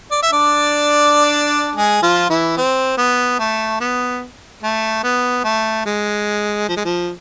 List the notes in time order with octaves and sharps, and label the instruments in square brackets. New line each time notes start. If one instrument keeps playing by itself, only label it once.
[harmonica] D5
E5
D4 D5
G#3 G#4
F3 F4
E3 E4
C4
B3
A3
B3
A3
B3
A3
G#3
F3
G#3
F3